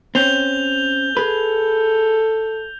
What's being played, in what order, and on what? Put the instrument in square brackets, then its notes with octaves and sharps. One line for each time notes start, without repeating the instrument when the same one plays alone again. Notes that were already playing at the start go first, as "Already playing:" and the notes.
[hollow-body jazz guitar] C4 C#4 [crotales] G6 F7 G7
[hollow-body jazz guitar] G#4 B4 [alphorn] A4